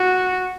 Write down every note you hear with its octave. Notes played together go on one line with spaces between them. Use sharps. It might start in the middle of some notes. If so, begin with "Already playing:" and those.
Already playing: F#4